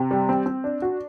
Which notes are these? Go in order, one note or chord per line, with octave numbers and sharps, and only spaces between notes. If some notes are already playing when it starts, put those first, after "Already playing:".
Already playing: C3
G3
C4
C4
D4
F#4